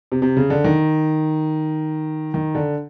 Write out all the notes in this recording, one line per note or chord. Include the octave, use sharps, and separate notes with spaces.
C3
C3
C#3
D3
D#3
D#3
D3